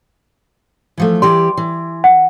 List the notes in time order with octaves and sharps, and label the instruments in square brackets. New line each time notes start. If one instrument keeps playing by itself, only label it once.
[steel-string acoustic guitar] E3 F3 A3
[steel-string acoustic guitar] E3 G4 D5 [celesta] C6
[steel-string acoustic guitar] E3
[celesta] F#5